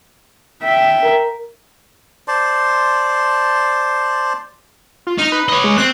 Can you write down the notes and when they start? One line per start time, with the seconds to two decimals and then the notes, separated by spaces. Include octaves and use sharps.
0.63 E5 G5
1.03 A#4
2.28 C5 D5 A5 C6
5.07 F4
5.18 D#4 F6
5.32 B4
5.49 C#5 D#5
5.64 G#3
5.78 C4 F#6